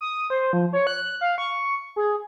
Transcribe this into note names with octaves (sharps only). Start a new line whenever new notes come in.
D#6
C5
F3
C#5
F#6
F5
C#6
G#4